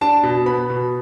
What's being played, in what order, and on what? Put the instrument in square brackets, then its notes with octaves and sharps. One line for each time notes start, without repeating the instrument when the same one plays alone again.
[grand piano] D4 A5
B2
B3 B5
B2